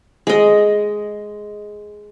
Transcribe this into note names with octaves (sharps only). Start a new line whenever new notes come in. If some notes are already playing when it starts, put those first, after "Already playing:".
G#3 D#5